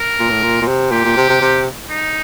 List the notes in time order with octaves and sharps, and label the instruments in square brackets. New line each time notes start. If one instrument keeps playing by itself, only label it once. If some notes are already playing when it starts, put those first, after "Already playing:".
Already playing: [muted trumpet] A#4
[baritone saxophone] A#2
A2
A#2
A#2
C3
[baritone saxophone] A#2 [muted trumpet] G4
[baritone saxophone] A#2
C3
C3
C3
[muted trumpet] D#4